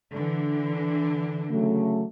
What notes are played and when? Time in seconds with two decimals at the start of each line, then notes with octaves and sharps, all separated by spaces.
0.13 D3 E3
1.49 C#3 F#3 A3